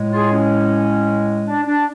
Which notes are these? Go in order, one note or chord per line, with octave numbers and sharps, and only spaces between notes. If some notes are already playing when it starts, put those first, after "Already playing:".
Already playing: A2 G#3
F4 G#4
C#4
D4
D4